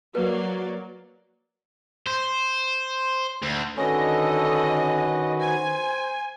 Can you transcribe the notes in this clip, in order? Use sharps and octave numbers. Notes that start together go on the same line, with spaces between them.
F#3 A#3 B4 D5
C5
D2
D3 D#3 C#4 F#4 A4 B4 D#5
C5 G#5